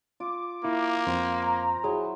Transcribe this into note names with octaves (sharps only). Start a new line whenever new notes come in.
F4 D6
A#3 E4
F2 C5 G5
A#5
F#3 E4 G#4